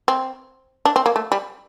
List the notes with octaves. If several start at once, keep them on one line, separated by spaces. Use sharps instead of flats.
C4
D4
C4
A#3
A3
G3